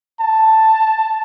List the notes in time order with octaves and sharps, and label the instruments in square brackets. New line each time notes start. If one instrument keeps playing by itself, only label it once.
[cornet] A5